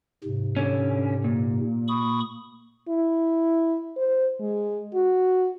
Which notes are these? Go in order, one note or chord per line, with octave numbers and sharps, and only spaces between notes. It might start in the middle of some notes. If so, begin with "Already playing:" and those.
G#2 C3
D3 C#4
A#2
B5 C#6 D#6
E4
C5
G#3
F#4